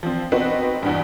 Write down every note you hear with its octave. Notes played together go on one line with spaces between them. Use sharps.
F3 C4
B3 C4 D#4 F#4
E2 G2